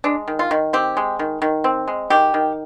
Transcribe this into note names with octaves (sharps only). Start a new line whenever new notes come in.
G#3 D4
D#3
F4
D#3
C4 G4
G#3
D#3
D#3
C4
G#3
D#3 G4
D#3